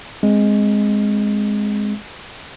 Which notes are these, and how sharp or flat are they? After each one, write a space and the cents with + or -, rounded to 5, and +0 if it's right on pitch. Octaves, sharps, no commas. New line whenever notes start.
G#3 +0 C4 +10